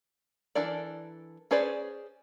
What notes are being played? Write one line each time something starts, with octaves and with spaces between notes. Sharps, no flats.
E3 D4 A4 A#4 D5
C#4 G#4 B4 C5 D5